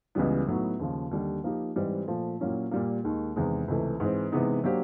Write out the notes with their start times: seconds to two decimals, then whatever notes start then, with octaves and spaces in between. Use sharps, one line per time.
0.15 C#2 C#3 E3 G3 B3
0.47 A2 F#3 B3 D#4
0.79 D#2 C#3 F3
1.11 D#2 D3 G3
1.44 F3 A#3 D#4 G4
1.76 G#2 E3 G3 C4
2.07 A#2 F3 A3
2.40 A#2 F#3 A#3 C#4 E4
2.71 A#2 G3 A#3
3.04 D#2 D#3 G#3
3.36 E2 C3 D#3 G#3
3.68 C#2 C3 E3 A3
4.00 G#2 E3 G#3 C4
4.32 C3 E3 G#3 B3 D#4
4.64 F#3 A#3 D4 G4 C5